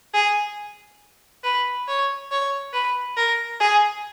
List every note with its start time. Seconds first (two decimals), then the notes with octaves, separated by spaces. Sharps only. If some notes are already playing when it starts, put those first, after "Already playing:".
0.14 G#4
1.44 B4
1.88 C#5
2.31 C#5
2.73 B4
3.17 A#4
3.60 G#4